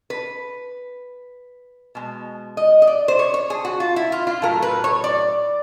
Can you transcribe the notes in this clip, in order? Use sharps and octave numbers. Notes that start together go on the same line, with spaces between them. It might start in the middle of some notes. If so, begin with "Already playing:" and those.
B4
B2 G#3
D#5
D#5
D5
C5
C#5
C#5
G#4
F#4
F4
E4
F4
F4
A2 F#3 A3 A#4
B4
C#5
D5